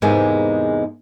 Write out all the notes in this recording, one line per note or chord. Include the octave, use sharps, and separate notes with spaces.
E2 G#2 C3 G#3 A#3 G#5